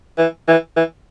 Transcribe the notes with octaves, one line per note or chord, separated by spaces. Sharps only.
E3
E3
E3